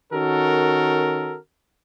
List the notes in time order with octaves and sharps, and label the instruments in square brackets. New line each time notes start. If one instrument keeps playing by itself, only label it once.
[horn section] D#3 C#4 F#4 A4 A#4